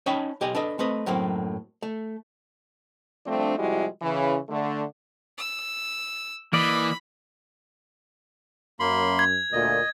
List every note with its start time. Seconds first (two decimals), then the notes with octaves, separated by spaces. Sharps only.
0.06 C#4 D#4 C#5 G5 A5 B5
0.41 B1 G4 D#5 G#5
0.55 D4 A4 B4 D#5
0.79 A3 C4 B4 D#5
1.06 F#2 A2 F#3 A#3 C4
1.82 A3
3.26 F3 G3 A3 C4 D4
3.58 C3 F3 G3 G#3 E4 F#4
4.02 C#3 E3
4.49 D3 A3
5.38 E6
6.53 E3 A#3 D5 D#5 B5
8.80 F#2 A#3 B5 C6
9.19 G#6
9.53 D2 A#2 D#5